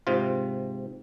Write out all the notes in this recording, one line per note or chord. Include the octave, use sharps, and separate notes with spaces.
G#2 C3 F4